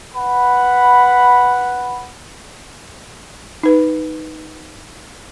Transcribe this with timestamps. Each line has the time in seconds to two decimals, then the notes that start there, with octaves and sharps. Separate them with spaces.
0.15 B4 F#5 B5
3.63 D#4 B4